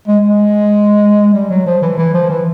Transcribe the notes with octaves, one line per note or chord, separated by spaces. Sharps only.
G#3
G#3
G3
F#3
F3
E3
E3
F3
E3